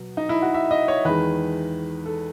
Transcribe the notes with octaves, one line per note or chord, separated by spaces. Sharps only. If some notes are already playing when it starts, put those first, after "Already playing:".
Already playing: B2 F#3
D#4
E4
F#4
E5
D#5
C#5
E2 D#3 G#3 B4
A4